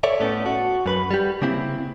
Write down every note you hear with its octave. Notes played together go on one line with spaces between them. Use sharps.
A4 C#5 D5 E5
A2 A3 B3 C#4 A4
F#4
F#2 B4 B5
G3 G4
C#3 A#3 C4 E4